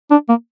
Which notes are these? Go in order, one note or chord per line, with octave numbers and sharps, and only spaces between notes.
D4
A#3